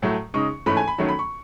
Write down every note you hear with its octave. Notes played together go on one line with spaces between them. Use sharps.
A2 F#3 A3
C#3 G#3 D#4 C#6
G#2 E3 A3 C#4 B5
G#5
B5
D#3 F#3 A3 C#4
B5
C#6